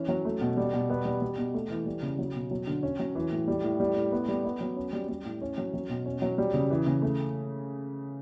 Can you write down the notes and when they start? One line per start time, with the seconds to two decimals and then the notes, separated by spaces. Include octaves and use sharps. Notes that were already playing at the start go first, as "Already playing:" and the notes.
Already playing: E3 C#4
0.08 F#3
0.25 A3
0.41 B2
0.57 G3
0.74 B2
0.90 B3
1.05 G3
1.22 G3
1.38 B2
1.54 A3
1.70 E3
1.86 G3
2.02 C#3
2.19 F#3
2.35 B2
2.51 F#3
2.67 D3
2.83 C#4
2.99 F#3
3.15 E3
3.32 A2
3.48 G3
3.64 A2
3.80 G3
3.96 A2
4.12 B3
4.28 G3
4.45 B3
4.61 F#3
4.76 C#4
4.93 G3
5.09 G3
5.25 A2
5.41 C#4
5.58 F#3
5.74 F#3
5.89 B2
6.06 C#4
6.22 F#3
6.38 G3
6.54 C#3
6.70 E3
6.86 C#3
7.02 A3